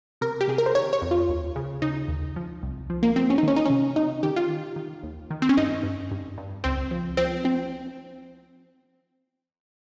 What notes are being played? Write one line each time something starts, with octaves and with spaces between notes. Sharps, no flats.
C3 A#4
G4
C3 G#4
A#4
C5
D#3 C#5
C#5
F2
F4
D#2
C#3
C#3 D#4
D#2
F3
C2
F3
A#3
F3 C4
C#4
D#4
D#3 C#4
D#4
C3 C#4
C3 D#4
D#3 G4
F4
D#3
D#3
D#2
D#3
C4
C#4
G2 D#4
G2
G2
G2
C#2 C4
F3
F3 C4
F3 C4